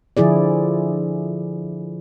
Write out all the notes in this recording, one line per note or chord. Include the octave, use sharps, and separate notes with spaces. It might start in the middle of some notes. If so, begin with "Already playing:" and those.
D3 F3 E4 G#4 D5